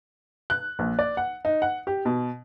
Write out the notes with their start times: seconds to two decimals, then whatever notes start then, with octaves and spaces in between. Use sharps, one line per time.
0.50 F#6
0.79 A#1
0.99 D5
1.17 F#5
1.45 D#4
1.62 F#5
1.87 G4
2.05 B2